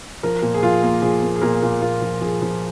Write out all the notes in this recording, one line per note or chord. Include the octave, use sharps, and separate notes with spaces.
F3 A#4
A#2
G#4
F3 F4
A#3
F3 G#4
A#3
G#4
A#2 A#4
A#2
A#2 F4
F3
F3 G#4
F3